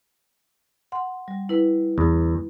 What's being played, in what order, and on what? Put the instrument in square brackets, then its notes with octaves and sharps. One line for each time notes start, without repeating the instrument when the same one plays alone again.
[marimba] F#5 C6
G3
E4 B4
[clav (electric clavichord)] E2